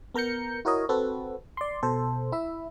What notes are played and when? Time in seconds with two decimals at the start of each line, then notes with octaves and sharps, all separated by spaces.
0.14 B3 A#4 A#5 G6 C#7
0.65 E4 F#4 A#4 C#5 D#5
0.89 C4 F#4 A4 B4
1.57 D5 C6
1.83 B2 A4 C5
2.32 E4 E5